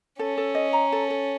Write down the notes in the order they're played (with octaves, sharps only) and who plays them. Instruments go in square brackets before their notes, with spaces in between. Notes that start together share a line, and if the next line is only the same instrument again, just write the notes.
[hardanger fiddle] C#4 [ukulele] A4
[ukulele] A4
D#5
A#5
A4
A4